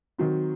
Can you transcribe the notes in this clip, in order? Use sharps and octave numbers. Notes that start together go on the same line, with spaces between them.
D#3 F#3 C4